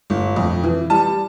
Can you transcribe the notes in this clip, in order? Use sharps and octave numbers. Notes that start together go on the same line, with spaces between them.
G1
F2
E3
G3 A5